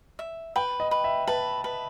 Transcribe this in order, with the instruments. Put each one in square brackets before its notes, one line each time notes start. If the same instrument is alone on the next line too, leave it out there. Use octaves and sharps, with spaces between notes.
[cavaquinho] E5
[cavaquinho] B4 [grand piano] G5
[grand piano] D#5
[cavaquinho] B4
[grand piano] E5
[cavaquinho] B4 [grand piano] A5
[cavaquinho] B4